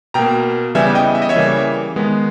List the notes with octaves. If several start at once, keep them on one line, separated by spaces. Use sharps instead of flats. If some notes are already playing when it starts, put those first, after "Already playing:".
B2 A#3 G5 A#5
C#3 E3 G3 B3 E5 G#5
D#5 G5
E5
D#5
C#5 E5
C#3 E3 G3 A#3
D#3 G#3 B3